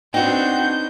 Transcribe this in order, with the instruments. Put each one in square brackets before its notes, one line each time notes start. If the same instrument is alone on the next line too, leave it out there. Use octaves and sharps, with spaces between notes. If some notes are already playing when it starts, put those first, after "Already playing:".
[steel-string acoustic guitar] B3 D#4 [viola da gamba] C4 D4 F#4 [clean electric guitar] F#5 G5 [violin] G6